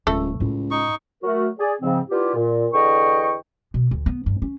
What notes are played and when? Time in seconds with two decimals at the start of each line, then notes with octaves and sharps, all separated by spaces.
0.07 D1 C#2 A3 A4
0.40 C#2 A2 E4
0.71 D#4 C#6
1.22 F#3 A3 F#4 A#4
1.58 G#4 D5
1.81 G#2 C#3 F3 C4
2.09 B3 D4 E4 F4 G4
2.35 A#2
2.73 E2 D3 D#5 G5 C#6
3.74 B2
3.91 D2
4.06 B3
4.26 G2
4.42 C#4